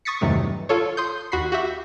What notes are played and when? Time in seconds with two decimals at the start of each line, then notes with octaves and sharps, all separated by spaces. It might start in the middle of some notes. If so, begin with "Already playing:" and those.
0.05 C#6 D#6 A6 B6 C#7
0.21 E2 G2 C3 D#3 F#3 A3
0.69 F4 A4 C#5
0.97 C6 D#6 G6
1.32 D#2 F#4 B5 C7
1.52 F#4 G4 E5